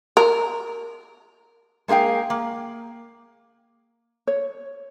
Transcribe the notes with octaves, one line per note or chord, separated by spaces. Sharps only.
A#4
G#3 A#3 G#4 F5 G5
A#3
C#5